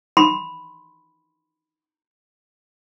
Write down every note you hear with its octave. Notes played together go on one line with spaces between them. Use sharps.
B5 C6